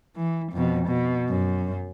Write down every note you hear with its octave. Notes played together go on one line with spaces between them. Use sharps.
E3
F2 B2
B2
F#2